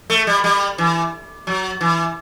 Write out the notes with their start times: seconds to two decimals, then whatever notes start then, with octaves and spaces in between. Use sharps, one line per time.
0.10 A3
0.27 G3
0.44 G3
0.78 E3
1.47 F#3
1.81 E3